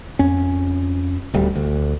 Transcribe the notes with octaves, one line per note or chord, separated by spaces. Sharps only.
F2 C#4
D#1 D2 G3
D2